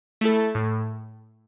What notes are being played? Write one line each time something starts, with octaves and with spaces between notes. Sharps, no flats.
A3 E4 A4
A2